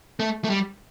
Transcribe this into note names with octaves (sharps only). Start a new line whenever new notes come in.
A3
A3
G3